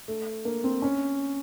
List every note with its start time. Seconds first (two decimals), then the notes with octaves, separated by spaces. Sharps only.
0.08 A3
0.45 A#3
0.64 C4
0.82 C#4